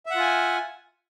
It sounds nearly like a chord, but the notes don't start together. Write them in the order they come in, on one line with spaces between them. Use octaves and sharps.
E5 F#5 F4 G#5